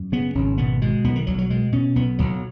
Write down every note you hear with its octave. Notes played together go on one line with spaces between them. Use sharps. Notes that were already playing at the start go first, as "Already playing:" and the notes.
Already playing: F#2
C#3 B3
G#1 C#4
B2 B3
B2 G#3
B1 B3
D#3
B1 F#3
F#3
B2 G#3
B2 C#4
B1 B3
B1 F#3